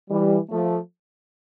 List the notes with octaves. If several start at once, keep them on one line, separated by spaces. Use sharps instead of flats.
E3 G3
F3 A3